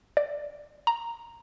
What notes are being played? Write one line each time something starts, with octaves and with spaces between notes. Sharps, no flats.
D5
A#5